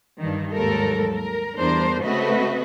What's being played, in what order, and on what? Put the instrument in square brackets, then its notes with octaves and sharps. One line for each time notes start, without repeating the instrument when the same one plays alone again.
[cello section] G2 D#3
D#2 G#2 F#3 G3 A4 A#4
A#4
E2 G3 D4 A#4 C5
C#3 A3 C4 F#4 B4 D#5